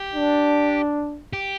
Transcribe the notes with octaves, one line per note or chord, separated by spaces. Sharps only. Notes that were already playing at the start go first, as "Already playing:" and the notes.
Already playing: G4
D4
G4